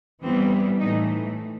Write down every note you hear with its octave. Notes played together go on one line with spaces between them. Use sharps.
G2 E3 G3 B3 C4
A2 E3 A3 D#4